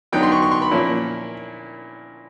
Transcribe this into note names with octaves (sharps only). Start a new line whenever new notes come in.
D3 F#3 B3 D#4 G5
C6
C#6
C#6
C6
B5
A#2 F3 A#3 C#4 E4